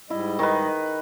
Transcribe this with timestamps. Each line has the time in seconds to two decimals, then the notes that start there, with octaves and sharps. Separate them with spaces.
0.10 G#2 G3 E4 D#5
0.39 D#3 B4